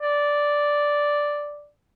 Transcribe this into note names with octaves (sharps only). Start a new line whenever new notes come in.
D5